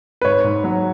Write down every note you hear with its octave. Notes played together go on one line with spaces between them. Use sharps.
B4
G#2 C#5
G#2
F#3